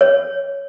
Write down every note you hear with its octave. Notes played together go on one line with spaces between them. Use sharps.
C#5